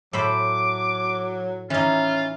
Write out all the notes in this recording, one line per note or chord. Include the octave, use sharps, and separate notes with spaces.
A2 F#3 C5 B5 D6
E3 C#4 D#4 F4